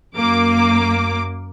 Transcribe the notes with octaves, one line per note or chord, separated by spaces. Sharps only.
F#2 A#3 D6